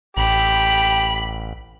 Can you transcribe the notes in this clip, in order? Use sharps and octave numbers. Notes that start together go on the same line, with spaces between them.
A1 G4 B5